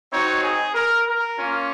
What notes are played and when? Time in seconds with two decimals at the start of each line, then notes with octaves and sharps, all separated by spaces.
0.12 C4 D#4 F#4 C#5
0.43 G#4
0.74 A#4
1.06 A#4
1.37 A#3 C#4 F4